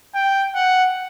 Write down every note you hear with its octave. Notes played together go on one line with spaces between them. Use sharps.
G5
F#5